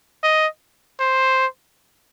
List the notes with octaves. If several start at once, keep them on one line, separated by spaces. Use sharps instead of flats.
D#5
C5